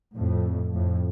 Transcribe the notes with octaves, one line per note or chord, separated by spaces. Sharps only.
F2 A2
F2 A2